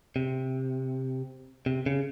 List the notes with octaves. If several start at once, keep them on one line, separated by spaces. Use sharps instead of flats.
C3
C3
C#3